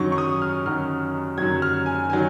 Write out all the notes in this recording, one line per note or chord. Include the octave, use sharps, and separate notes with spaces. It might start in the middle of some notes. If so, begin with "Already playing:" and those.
Already playing: F#2 D#3 F#3 C#6
C#6
D#6
F6
F#2 D#3 F#3 F6
F#2 D#3 F#3 G#6
F6
G#5
D#3 F#3 G#5